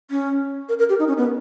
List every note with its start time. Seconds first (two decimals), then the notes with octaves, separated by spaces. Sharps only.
0.11 C#4
0.69 A#4
0.79 A#4
0.89 G4
0.99 D#4
1.08 C#4
1.18 B3